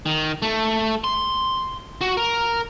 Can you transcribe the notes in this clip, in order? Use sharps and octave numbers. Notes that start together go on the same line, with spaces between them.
D#3
A3
C6
F#4
A#4